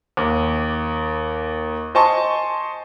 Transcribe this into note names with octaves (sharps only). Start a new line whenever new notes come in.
D#2
C5 D#5 G#5 A5 C6 C#6